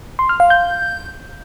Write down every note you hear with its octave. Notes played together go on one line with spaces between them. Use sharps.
C6
F6
F5
G6